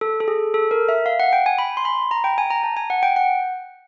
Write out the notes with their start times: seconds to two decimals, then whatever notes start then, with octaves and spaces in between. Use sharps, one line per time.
0.01 A4
0.20 A4
0.28 G#4
0.54 A4
0.71 A#4
0.88 E5
1.06 F5
1.20 F#5
1.33 G5
1.46 G#5
1.58 B5
1.77 C6
1.85 B5
2.11 A#5
2.24 G5
2.38 G#5
2.50 A#5
2.63 A5
2.77 G#5
2.90 F#5
3.03 G5
3.16 F#5